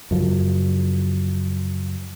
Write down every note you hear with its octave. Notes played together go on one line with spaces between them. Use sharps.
F#2 C#3 F3